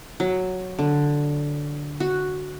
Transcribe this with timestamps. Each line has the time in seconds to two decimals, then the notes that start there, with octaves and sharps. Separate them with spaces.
0.20 F#3
0.79 D3
2.00 F#4